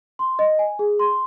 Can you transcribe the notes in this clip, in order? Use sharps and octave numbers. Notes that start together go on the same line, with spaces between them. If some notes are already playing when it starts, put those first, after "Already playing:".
C6
D#5
G#5
G#4
C6